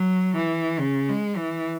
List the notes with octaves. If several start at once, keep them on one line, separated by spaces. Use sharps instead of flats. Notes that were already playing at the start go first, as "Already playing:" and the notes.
Already playing: F#3
E3
C#3
G#3
E3